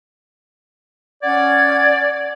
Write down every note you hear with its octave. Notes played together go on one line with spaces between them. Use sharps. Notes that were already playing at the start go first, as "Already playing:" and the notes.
C#4 D5 F#5 G#6